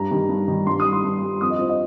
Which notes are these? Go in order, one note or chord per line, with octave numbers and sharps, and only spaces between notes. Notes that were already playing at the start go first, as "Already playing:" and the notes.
Already playing: G2 A#5
D#3 G3
G2
D#3 G3
G2 C6
D#6
G3
C6
G2
G3
F2 D#6
D#5
F3 C5
D#5